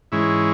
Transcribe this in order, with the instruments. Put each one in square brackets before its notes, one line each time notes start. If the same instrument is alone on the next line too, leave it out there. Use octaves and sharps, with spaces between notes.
[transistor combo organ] G#2 E3 G#3 C#4 E4